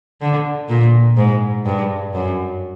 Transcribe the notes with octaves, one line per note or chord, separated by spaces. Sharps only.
D3
A#2
G#2
G2
F#2